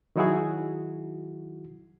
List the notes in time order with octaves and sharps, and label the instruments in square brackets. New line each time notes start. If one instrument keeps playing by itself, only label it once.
[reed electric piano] D#3 F#3 D#4 E4 F#4 G#4